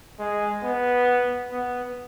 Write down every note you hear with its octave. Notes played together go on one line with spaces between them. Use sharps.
G#3
B3
B3